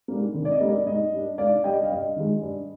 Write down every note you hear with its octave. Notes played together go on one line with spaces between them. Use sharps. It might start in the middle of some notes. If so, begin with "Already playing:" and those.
G#2 G3 A#3
G#1
D5
D#5
G#2 G3 A#3
D5
G#2 D#5
G3 D4
G#2 D5 F5
G3 D4 D#5 G5
F5
G2 D#5
D#3 G#3
G2